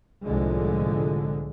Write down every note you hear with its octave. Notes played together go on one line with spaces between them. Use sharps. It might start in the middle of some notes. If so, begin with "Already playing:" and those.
C2 A2 D3 F3 G#3